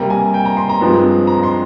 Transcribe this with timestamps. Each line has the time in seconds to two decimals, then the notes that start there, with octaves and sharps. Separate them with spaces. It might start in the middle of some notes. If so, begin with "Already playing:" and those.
Already playing: C3 G3 A#3 A#5
0.10 G#5
0.34 G5
0.45 A#5
0.57 C6
0.69 A#5
0.81 G2 F3 G#3 C4
1.27 A#5
1.43 C6